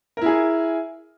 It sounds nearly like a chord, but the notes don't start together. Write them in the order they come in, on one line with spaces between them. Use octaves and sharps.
A#4 E4 G#4